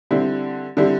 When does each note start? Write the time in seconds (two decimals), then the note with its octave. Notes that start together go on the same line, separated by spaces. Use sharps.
0.11 D3 G3 C4 E4
0.77 D3 G3 C4 E4